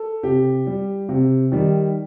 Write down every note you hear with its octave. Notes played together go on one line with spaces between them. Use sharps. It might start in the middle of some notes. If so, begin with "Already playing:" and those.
Already playing: A4
C3 G4
G3
C3
D#3 G3